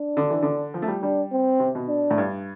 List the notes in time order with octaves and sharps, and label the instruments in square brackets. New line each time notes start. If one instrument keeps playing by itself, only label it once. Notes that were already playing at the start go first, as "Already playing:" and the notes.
Already playing: [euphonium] D4
[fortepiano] D3
E3
D3
F3
A3
G3
[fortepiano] G3 [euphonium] D4
[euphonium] C4
[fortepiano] C3
B2
[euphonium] D4
[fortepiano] A2
G2